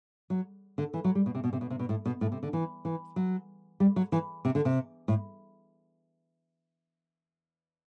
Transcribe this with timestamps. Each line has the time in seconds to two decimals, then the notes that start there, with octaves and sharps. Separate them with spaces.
0.30 F#3
0.78 D3
0.94 E3
1.04 F#3
1.15 G3
1.26 B2
1.35 C3
1.44 B2
1.53 C3
1.61 B2
1.70 C3
1.79 B2
1.89 A2
2.05 B2
2.21 A2
2.32 C3
2.43 D3
2.53 E3
2.85 E3
3.16 F#3
3.80 G3
3.96 F#3
4.12 E3
4.45 C3
4.55 D3
4.65 C3
5.08 A2